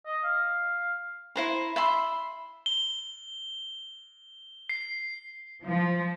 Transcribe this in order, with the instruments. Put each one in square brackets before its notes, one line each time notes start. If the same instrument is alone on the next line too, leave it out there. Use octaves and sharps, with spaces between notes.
[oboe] D#5
F5
[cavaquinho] E4 C5 A#5
E5 B5 C6
[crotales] G7
C7
[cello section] F3